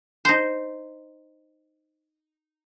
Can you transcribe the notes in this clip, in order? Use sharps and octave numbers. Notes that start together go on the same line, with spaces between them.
D#4 C5